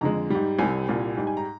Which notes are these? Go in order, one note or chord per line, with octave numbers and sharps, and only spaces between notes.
F2 D3 G#3 A#5
G#2 G3
C2 C3 G3 G#5
C2 A#2 G3
G#2 G3
G#5
A#5